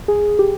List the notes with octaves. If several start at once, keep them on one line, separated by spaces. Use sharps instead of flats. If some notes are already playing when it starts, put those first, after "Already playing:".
G#4
G4